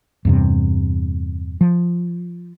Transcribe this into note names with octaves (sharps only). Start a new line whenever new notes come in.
E2 G2 C3
F3